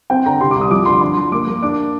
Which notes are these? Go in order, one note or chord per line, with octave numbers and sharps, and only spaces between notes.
C4 G5
D3 A#5
C3 C6
D6
C2
D#6
F3 D6
D3 C6
D4 C6
F3 C6
A#3 D6
A#3
D4 D6